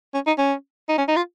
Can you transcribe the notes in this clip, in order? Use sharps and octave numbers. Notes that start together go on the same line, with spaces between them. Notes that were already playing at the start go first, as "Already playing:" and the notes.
C#4
D#4
C#4
D#4
C#4
D#4
F4